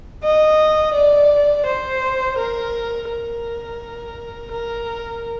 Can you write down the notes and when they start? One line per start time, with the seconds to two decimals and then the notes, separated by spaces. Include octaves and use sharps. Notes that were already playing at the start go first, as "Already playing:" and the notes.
0.24 D#5
0.94 D5
1.66 C5
2.38 A#4
3.10 A#4
4.52 A#4